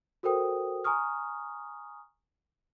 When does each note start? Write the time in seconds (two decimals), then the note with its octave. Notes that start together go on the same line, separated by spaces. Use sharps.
0.23 F#4 A4 A#4 C5 G5 D#6
0.84 G#5 A#5 C#6 D#6 F6